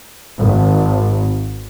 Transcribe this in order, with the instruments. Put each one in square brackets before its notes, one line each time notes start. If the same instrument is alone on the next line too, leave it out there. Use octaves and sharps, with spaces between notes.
[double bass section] G#1